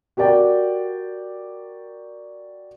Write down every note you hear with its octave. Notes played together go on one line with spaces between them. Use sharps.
F#4 G4 A#4 D5 G5